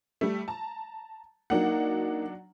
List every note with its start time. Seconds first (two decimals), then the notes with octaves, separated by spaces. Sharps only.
0.21 G3 A3
0.48 A5 A#5
1.50 F#3 A#3 D4 D#4 F#5